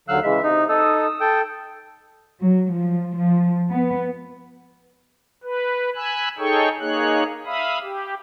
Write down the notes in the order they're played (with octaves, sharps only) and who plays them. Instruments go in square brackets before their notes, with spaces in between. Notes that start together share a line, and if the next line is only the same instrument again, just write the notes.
[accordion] D#2 D3 F#3 [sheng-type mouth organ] F5 E6 F#6
[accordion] C#3 E3 G#3 [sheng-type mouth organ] E5
[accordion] C3 [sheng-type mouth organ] D#4
[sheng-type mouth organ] D#4 A4 [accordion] D#6 E6
[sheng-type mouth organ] A4 G5
[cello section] F#3
F3
F3
B3
[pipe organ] B4
G#5 B5 E6 F#6
D#4 G#4 A4 C#5 G5 C#6
A#3 D#4 G#4 C#5 F#6
E5 F5 B5 D#6
G4